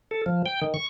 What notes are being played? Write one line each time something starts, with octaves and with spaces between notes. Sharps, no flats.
A4
F3
G5
D#3
C#6